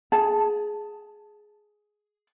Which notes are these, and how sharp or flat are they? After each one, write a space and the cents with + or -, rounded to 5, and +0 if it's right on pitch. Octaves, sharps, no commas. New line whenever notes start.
G#4 +10 A5 +0